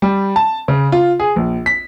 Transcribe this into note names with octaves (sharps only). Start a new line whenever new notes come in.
G3
A5
C#3
F4
G#4
A#1
B6